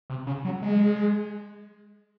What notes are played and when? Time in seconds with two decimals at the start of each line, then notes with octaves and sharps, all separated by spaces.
0.10 C3
0.27 C#3
0.45 F#3
0.62 G#3